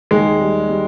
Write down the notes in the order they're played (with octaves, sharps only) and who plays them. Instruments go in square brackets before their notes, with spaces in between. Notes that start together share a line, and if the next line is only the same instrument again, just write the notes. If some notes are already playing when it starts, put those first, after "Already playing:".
[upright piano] D#2 [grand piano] G#3
[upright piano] G3
G3